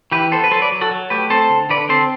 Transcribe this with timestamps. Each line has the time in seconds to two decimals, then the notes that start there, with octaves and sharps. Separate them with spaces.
0.11 E3 G4 B4
0.32 B3 A4 C5
0.44 B4
0.51 F#3 A4 C5
0.62 B4 D5
0.72 F#3
0.81 F#4 A4
0.91 F#3
1.10 A3 G4 B4
1.30 C4 A4 C5
1.50 D3
1.69 D3 B4 D5
1.89 C4 A4 C5